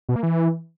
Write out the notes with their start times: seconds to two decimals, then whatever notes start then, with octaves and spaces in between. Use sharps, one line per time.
0.09 B2
0.16 A#3
0.23 E3